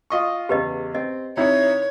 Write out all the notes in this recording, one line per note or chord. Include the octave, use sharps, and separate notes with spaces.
F4 D#5 C#6
E2 C#3 G4 B4 D#5
C4 D#5
C3 D#4 E4 C#5